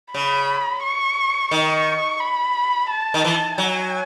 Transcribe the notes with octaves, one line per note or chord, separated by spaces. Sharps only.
C#3 B5
C#6
D#3 C#6
B5
A5
D#3
E3
F#3 G#5